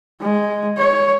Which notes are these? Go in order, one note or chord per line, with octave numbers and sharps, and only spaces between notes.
G#3
C#5